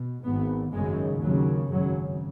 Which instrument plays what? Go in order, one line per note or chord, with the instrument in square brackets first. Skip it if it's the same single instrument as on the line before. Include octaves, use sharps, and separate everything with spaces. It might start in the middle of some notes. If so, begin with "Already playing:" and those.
Already playing: [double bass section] B2
G#1 G#2 B3
G#1 F#2 C#3 G#3
D#2 C#3 F#3
G#1 F#2 C#3 F#3